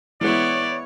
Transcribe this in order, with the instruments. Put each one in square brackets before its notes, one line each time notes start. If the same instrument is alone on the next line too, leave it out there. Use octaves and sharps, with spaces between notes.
[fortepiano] E3 G#3 [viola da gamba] B3 E4 [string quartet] C#5 [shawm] D5